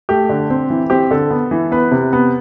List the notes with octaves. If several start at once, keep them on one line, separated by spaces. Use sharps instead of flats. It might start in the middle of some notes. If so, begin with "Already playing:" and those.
A3 G4
D3
C4
E3
C4 G4
D3 A4
B3
E3
B3 B4
C3
B3